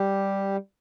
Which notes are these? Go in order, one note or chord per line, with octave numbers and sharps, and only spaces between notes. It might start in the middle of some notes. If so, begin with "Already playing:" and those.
Already playing: G3 G4